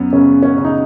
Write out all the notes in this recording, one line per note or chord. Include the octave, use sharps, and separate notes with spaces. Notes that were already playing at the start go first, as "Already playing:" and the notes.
Already playing: F#2 B3
C#3 C#4
C#4
C#3
D#4